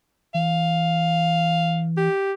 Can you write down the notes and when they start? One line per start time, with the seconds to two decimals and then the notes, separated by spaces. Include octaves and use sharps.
0.34 E3 F5
1.97 G4